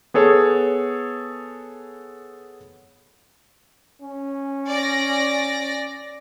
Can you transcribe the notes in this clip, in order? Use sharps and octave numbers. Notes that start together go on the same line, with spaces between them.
B3 G#4 A4 C#5
C#4
D5 A#6